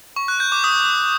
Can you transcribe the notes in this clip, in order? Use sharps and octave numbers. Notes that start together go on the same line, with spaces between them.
C#6
F#6
G6
D6
D#6